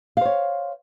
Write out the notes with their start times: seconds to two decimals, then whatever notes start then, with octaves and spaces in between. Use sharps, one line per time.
0.17 F5
0.21 C5
0.25 C#5